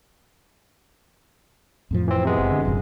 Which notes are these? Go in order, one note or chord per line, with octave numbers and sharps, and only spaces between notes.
F2 A2 F3
E3 C4
C3 G#3 B3
F#1
D3
E1 A1 F#2